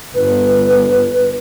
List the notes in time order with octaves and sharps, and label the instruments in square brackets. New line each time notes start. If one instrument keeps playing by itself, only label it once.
[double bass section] G1 [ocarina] B4